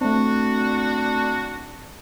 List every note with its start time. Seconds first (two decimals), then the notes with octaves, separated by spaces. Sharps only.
0.01 A3 C4 D4 F#4